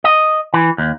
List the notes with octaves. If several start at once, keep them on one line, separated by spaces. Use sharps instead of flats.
D#5
E3
D#2